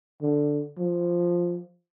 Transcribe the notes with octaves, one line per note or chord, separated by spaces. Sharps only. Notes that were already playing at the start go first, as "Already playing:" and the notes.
D3
F3